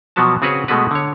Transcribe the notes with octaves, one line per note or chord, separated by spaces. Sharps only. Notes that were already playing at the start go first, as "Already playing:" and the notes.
B2 F3 F#3 B3 F#4 A5
C#3 C4 F#4 G#4 B4 C#5
B2 G#3 A3 B3 F#4 B4
D3 C#5